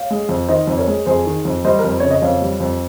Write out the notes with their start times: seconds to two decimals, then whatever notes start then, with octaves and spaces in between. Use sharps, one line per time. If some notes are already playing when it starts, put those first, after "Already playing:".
Already playing: C#5 F5
0.11 G#3
0.29 F2
0.48 D#3 C5 D#5
0.67 F2
0.77 A#4 C#5
0.88 G#3
1.06 F2 G#4 C5
1.26 D#3
1.45 F2
1.65 G3 C5 D#5
1.79 A#4
1.84 F2
1.91 C5
2.00 C#3 C#5
2.11 D#5
2.22 F2 C#5 F5
2.42 G3
2.60 F2